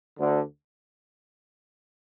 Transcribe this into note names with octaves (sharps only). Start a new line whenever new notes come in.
D2 D3